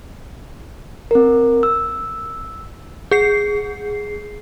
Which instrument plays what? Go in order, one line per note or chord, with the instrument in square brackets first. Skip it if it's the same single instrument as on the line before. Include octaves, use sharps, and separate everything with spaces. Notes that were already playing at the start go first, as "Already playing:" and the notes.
[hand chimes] C4 A#4
E6
[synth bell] G#4 C7